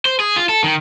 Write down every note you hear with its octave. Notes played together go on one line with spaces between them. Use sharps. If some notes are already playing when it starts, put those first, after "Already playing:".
C5
G#4
F4
A4
D#3